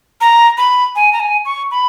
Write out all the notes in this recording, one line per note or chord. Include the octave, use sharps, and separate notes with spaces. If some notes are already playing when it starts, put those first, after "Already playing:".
A#5
B5
G#5
A#5
G#5
C#6
B5